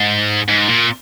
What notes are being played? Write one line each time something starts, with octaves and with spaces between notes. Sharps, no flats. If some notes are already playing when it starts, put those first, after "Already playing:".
Already playing: G#2
G#2
A#2